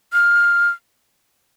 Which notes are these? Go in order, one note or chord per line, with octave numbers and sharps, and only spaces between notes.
F6